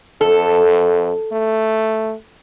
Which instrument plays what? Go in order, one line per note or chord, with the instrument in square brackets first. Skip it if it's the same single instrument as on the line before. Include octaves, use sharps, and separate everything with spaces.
[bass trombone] F2 [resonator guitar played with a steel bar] A4
[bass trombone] A3